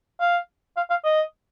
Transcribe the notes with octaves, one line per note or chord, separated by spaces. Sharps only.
F5
F5
F5
D#5